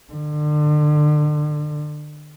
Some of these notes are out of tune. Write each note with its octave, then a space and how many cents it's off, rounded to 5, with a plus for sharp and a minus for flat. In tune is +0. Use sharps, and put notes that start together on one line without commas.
D3 +35